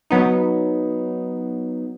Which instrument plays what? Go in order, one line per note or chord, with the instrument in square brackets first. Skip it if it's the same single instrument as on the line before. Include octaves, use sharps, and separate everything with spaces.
[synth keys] F#3 B3 D#4